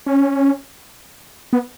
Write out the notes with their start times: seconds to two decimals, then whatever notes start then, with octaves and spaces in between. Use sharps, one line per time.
0.06 C#4
1.53 B3